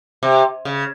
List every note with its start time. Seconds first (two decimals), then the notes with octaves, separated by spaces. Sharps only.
0.23 C3
0.65 C#3